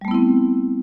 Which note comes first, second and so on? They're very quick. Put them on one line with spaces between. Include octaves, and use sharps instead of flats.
G3 A3 B3 E4 C4